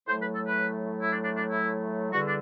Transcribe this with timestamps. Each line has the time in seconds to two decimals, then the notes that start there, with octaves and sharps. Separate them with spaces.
0.07 A2 F#3 A3 C5
0.19 B4
0.32 A4
0.45 B4
1.01 E4
1.10 D4
1.22 D4
1.36 D4
1.48 E4
2.12 E2 D3 G3 F#4
2.26 D4